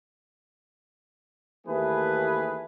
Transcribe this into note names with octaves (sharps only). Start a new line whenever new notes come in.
D#2 E3 A3 G#4 B4